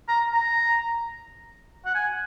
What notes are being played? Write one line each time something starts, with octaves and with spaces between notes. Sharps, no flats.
A#5
A#5
F#5
G#5